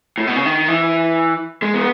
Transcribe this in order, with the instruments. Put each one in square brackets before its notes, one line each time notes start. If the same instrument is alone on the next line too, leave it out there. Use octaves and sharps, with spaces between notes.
[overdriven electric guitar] A2
B2
C#3
D#3
E3
G#3
B3